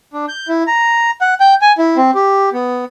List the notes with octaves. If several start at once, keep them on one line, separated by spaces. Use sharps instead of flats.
D4
G6
E4
A#5
F#5
G5
G#5
E4
C4
G4
B3